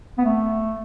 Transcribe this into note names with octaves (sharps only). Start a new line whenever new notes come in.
B3
A3